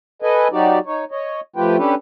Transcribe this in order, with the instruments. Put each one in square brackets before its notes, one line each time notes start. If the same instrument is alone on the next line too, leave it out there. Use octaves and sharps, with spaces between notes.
[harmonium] A4 B4 D#5 G#5
F#3 D#4 F#4 G4 D5
D#4 C#5
C#5 D#5
F3 A3 F4 G4 B4 G5
C#4 D4 G4 A4 B4